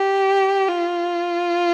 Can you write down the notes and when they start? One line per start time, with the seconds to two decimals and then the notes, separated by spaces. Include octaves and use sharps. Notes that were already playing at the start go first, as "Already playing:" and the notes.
Already playing: G4
0.68 F4